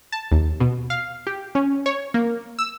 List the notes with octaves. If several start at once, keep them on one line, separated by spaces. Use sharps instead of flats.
A5
D#2
B2
F5
G4
C#4
C#5
A#3
E6